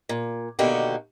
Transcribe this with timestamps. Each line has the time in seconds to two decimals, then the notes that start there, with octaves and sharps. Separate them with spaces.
0.09 A#2
0.59 B2 D3 D#3 A#3 F#4 G4